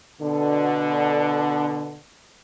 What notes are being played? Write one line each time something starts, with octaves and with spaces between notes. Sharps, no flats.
B2 D3